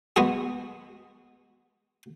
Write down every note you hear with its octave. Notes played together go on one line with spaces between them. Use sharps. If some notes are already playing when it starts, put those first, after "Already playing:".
G#3 B3 F#4 G#4